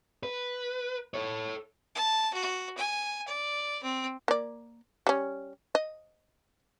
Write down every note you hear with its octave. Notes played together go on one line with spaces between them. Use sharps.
B4
A4 C#5
A5
F#4
G#5
D5
C4
A#3 D5
G3 C#4
D#5